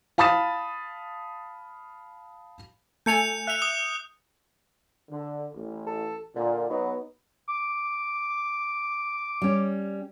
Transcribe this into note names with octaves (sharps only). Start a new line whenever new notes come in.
F5 A5 B5 D#6 A6 E7
A3 A4 G#5 G6 C#7 F7
E5 F#6 F7
D#6
D3
A1
A4
A#2 D3
F#3 B3 D#4
D6
G3 C#4